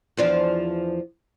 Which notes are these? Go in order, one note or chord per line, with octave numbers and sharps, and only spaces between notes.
E2 F3 D4